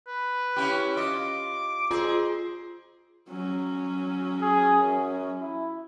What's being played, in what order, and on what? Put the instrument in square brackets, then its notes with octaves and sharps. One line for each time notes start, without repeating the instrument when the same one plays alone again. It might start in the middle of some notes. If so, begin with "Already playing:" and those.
[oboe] B4
[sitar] C#4 E4 G4
[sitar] F4 D#5 [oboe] D6
[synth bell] F4 [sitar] G#4 [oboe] C5
[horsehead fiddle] F#3 C#4
[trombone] G#4
F#2
E4